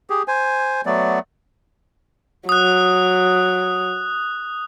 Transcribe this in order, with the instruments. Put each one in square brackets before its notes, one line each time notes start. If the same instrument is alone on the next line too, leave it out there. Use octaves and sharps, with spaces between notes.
[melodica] G4 G#4
C5 G#5
F#3 A3 B3 D5
[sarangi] F#3 [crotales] D#6 F#6